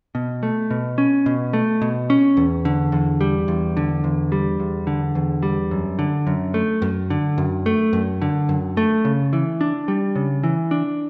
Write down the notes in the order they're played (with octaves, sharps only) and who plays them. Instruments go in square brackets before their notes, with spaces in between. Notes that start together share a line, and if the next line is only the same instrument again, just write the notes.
[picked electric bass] B2
A3
B2
C#4
B2
A3
B2
C#4
E2
D3
E2
G3
E2
D3
E2
G3
E2
D3
E2
G3
F#2
D3
F#2
A3
F#2
D3
F#2
A3
F#2
D3
F#2
A3
C#3
E3
D4
G3
C#3
E3
D4